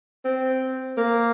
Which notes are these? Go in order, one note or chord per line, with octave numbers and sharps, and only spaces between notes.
C4
A#3